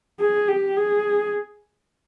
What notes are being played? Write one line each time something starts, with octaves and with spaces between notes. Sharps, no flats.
G#4
G4
G#4